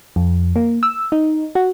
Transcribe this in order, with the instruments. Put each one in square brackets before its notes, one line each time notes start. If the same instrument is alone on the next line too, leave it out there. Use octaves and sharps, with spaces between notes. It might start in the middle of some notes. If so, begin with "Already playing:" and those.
[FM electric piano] F2
A#3
E6
D#4
F#4